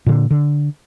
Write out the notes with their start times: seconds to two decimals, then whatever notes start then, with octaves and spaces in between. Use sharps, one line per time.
0.06 A#2 D3
0.31 D3